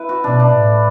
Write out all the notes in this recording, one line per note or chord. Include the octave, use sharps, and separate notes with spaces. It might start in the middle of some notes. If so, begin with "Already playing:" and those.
Already playing: E4 B4
F#4
B2 D4
D4
A2